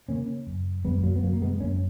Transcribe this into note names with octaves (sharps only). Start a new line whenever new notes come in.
C#3 A#3 C#4
F#2
F#2 G#3 B3
F#3 A#3
B3
C#3 F#3 A#3
A#3
G#3 B3
F#2 A#3 C#4